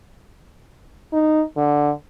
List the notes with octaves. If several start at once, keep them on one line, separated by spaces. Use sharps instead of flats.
D#4
D3